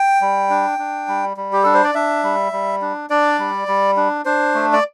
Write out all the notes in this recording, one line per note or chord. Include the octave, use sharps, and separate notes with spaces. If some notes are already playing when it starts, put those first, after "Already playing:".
Already playing: G5
G3
D4
D4
G3
G3
G4
D4 A4
C5
D5
D4 E5
G3
G3
D4
D4 D5
G3
G3
D4
D4 C5
A3
D5